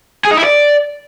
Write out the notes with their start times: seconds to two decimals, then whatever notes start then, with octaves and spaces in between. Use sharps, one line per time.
0.25 G#4
0.31 D#4
0.38 E4
0.44 D5